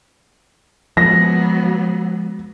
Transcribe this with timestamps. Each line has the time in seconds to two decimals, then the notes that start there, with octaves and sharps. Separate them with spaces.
0.97 F3 F#3 G#3 B3 A#6